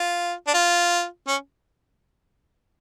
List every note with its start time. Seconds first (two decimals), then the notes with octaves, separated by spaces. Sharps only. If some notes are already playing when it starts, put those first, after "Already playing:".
Already playing: F4
0.47 D4
0.54 F4
1.27 C#4